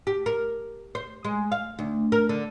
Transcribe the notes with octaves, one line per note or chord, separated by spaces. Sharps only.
G4
A#4
C5
G#3
F5
D2
A#4
D3